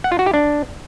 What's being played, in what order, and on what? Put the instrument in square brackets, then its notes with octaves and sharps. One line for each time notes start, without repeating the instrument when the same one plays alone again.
[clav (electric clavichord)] F#5
F4
F#4
G4
D4